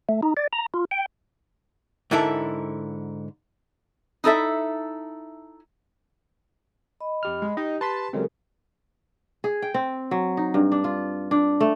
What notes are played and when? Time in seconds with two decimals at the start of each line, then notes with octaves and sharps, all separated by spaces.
0.09 A3
0.23 D#4
0.37 D5
0.53 A#5
0.74 F4
0.91 G5
2.11 G#2 D3 E4 A4 A#4
4.24 D#4 E4 A4 E5
7.00 D#5 B5
7.23 F2 G4 F6
7.42 G#3
7.57 D#4 G4 D#5 G5
7.81 B4 A5 C6 B6
8.13 C#3 F#3 G#3 C4 G4 A4 A#4
9.44 G#4
9.62 G5
9.74 C4
10.11 F#3
10.37 D#4
10.54 G2
10.72 D4
10.84 F4
11.31 D4
11.60 A3